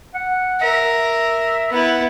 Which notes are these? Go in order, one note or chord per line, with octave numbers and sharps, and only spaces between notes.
F#5
A#4 E5
B3 E4 F#5